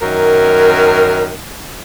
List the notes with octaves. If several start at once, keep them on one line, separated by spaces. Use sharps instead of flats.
F#2 D#3 A#4